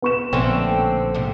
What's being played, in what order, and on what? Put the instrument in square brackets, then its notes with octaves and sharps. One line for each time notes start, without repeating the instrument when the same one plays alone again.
[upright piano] B3 C#6 E7
[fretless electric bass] A#1 [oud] D3 A3 C#4 [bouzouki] C4
[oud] G#2 C3